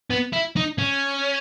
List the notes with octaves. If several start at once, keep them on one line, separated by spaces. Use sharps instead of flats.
B3
E4
D#4
C#4